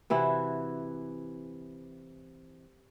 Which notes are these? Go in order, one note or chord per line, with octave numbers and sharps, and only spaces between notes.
C3 E3 E4 F#4